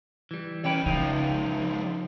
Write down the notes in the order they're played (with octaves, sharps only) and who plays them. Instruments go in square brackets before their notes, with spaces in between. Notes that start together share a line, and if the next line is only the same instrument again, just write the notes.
[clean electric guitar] E3 G3
[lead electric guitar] D#3 G5 [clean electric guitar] E3 C#4 B4
[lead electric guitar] C#2 F3 [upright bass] C#3 [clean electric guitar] D#4